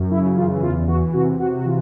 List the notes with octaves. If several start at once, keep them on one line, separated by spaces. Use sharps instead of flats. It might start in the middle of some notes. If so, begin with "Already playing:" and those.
Already playing: F#2
C#3 E4
E3 F4
E2 F4
E3 F#4
C3 F#4
C3 F#4
F#4
E3 F4